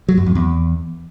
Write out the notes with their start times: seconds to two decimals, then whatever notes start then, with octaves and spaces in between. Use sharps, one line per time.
0.08 F#3
0.17 F#2
0.26 F2
0.35 E2